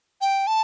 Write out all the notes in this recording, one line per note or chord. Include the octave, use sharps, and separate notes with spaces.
G5
A5